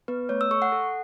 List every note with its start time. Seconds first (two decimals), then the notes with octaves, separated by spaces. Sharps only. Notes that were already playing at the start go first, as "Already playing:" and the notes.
0.08 B3 B4
0.29 A3 C#5
0.41 E6
0.51 A4 C#6
0.62 F#5
0.72 A4